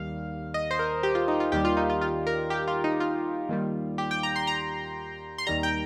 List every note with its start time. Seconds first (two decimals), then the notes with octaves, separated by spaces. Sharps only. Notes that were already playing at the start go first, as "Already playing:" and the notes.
Already playing: D#2 D#3 G3 F5
0.54 D#5
0.71 C5
0.79 A#4
1.03 G4
1.15 F4
1.28 D#4
1.40 F4
1.52 D#2 D#3 G3 G4
1.65 F4
1.77 D#4
1.90 F4
2.01 F4
2.27 A#4
2.50 G4
2.68 F4
2.84 D#4
3.00 F4
3.49 D#2 D#3 G3
3.98 G4
4.11 G5
4.23 A#5
4.36 C6
4.47 A#5
5.38 C6
5.47 D#2 D#3 G3 A#5
5.63 G5